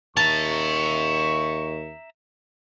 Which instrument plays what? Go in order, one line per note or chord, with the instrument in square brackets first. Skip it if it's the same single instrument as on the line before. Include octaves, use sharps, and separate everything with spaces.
[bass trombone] D#2 [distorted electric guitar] E5 A#5 [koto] A5 [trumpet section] C#6